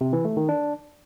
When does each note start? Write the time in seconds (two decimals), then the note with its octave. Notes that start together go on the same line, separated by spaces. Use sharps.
0.01 C3
0.13 E3
0.25 A3
0.37 D#3
0.49 D4